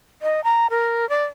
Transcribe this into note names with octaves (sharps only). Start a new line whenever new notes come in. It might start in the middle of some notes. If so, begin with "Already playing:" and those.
D#5
A#5
A#4
D5